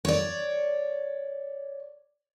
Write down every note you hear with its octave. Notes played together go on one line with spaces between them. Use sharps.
C#5 D5